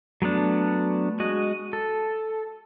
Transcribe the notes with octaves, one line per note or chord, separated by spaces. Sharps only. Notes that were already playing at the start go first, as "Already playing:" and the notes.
F#3 A3 B3 D4
G#3 F#4 D#5
A4